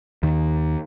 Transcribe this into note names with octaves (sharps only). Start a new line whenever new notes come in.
D#2 D#3